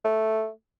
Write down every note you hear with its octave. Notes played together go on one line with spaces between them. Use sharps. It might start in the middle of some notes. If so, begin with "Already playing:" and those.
A3